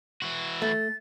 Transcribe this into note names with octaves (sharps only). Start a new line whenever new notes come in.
E3 F#4
A3 A6